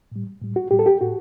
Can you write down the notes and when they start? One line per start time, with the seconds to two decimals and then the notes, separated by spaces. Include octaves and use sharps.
0.12 A2 G3
0.42 A2 G3
0.56 F#4
0.71 A2 G3 G4
0.79 A4
0.86 G4
1.01 A2 F#4